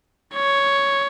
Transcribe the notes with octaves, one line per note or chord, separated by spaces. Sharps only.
C#5